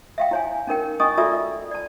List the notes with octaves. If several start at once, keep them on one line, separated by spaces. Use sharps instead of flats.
E5 F5 G5
E4 C#5 G#5
C#4 D#4 A#4 G5
C#4 E4 D#5 G#5 C#6 D#6
F4 F#4 A4 D5 E5 E6
D5 A5